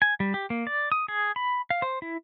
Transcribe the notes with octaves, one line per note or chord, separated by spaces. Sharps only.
G#5
G3
G4
A#3
D5
D#6
G#4
B5
F5
C5
E4